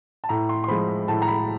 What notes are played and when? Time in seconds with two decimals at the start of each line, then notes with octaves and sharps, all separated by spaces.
0.24 A5
0.29 A2 A#5
0.49 C6
0.64 C6
0.68 F3 G#3 B5
1.08 A2 A5
1.22 A#5
1.28 B5